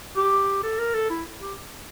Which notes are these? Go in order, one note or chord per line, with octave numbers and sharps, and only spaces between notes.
G4
A4
A#4
A4
E4
G4